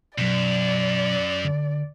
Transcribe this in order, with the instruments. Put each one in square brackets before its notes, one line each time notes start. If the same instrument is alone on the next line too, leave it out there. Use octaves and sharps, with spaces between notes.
[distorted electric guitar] F#2 [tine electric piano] B2 F#3 [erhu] D5
[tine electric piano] D3